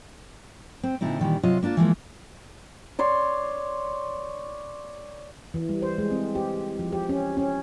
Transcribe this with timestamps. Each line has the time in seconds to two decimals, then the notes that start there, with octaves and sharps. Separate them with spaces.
0.83 C4
1.01 A#2 D3 C4 D#4 E4
1.19 A#2 D#3 E3 G3
1.43 C3 F#3 F4 D#5
1.63 A#3 D4 D#4 F4
1.77 E3 F3 G#3 A#3
2.99 C#5 D5 C6
5.54 E3
5.69 G3
5.82 C5
5.98 G#3
6.11 C4
6.35 G4
6.79 F3
6.92 G4
7.09 C#4
7.37 C#4